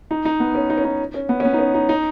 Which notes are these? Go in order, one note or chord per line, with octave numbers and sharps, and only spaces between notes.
D#4
D#4
B3
C#4
D#4
C#4
D#4
C#4
B3
C#4
B3
D#4
C#4
D#4
D#4